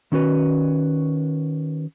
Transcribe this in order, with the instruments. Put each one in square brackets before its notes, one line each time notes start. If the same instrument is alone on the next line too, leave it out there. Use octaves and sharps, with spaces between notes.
[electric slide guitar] D#3 C#4 F#4 B4